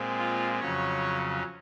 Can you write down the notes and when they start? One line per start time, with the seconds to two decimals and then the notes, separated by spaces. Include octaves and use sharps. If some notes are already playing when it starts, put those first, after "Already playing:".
Already playing: A#2 G#3 C4
0.18 F4
0.59 F2 C#3 F#3 C#4 C#5